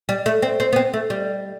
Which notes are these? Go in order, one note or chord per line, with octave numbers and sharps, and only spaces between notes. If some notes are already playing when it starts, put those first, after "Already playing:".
G3
A3
C4
C4
B3
C4
A3
G3